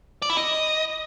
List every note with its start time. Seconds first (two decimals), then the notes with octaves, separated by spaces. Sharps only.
0.22 D5
0.30 E4
0.37 D#5